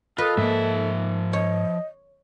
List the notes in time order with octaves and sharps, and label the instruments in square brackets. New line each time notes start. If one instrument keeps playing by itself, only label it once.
[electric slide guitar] F4 [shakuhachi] A4 [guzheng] B4 D#5
[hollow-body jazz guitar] G#2 A#3 [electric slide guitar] F3 E5
[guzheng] C#5 [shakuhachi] D#5